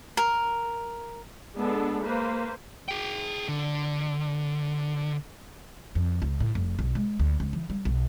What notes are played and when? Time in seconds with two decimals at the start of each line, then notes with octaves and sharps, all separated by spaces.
0.17 A#4
1.57 G#3 B3 D4 A4
2.03 A#3 B4 C5
2.88 G#4 G5
3.48 D3
5.95 F2
6.22 C#2
6.40 A2
6.55 F1
6.79 B1
6.95 G#3
7.20 D2
7.40 C#2
7.53 E3
7.70 G3
7.85 B1